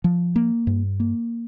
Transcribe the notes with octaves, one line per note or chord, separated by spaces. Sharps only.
F3
A#3
G2
A#3